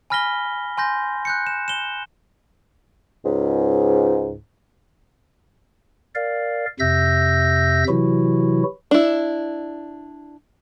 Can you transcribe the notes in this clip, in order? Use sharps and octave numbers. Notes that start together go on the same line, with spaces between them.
G#5 B5 F6 A#6 B6 G7
G#5 C6 G6 A#6
F#6 G6 C#7
E7
E7 G7
C#2 G#2
A#4 D5 F5
F2 C3 E5 E6 G6 A#6
C3 E3 F#3 E4 F#4
D4 E4